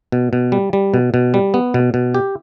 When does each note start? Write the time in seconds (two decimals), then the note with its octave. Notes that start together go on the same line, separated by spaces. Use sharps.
0.12 B2
0.33 B2
0.52 G3
0.73 G3
0.94 B2
1.14 B2
1.34 G3
1.54 B3
1.74 B2
1.94 B2
2.14 G4